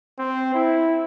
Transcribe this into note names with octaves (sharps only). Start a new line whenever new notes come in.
C4
E4